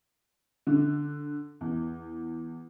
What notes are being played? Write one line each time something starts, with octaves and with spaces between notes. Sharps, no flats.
D3
E2